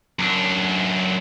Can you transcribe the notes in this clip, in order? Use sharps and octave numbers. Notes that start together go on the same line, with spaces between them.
F#2 D4